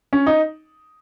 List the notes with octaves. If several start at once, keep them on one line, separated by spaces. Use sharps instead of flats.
C#4
D#4